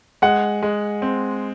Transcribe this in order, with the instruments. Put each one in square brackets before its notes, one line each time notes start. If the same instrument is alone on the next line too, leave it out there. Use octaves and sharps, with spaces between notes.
[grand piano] G#3 [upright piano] F#5
[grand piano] G#3
C4